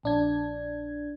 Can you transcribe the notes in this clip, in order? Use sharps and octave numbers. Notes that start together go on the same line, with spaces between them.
A#1 D4 G#6